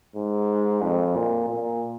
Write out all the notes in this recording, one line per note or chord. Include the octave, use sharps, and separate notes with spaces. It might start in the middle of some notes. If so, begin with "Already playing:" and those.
G#2
F2
A#2
A#2